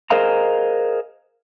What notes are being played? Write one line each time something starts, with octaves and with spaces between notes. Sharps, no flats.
G#4 A#4 C5 D#5 F5 A#5